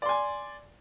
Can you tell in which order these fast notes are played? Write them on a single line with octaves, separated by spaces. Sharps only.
D5 C6 G#5